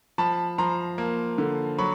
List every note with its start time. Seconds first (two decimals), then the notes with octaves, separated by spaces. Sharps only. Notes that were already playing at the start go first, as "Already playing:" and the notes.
0.18 F3 A5 B5
0.58 F3 A#5 C6
0.98 A#3
1.38 D3
1.79 F#3 B5 C#6